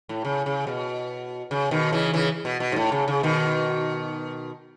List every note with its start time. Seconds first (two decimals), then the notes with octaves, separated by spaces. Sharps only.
0.09 A2
0.25 C#3
0.46 C#3
0.67 B2
1.51 C#3
1.71 B2 D#3
1.93 C#3 E3
2.14 C#3 E3
2.45 B2
2.60 B2
2.72 G#2
2.76 A2
2.92 C#3
3.08 C#3
3.23 B2 D#3